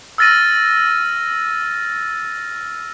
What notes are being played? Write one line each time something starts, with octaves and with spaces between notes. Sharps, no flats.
E6 F6 A6 A#6 D#7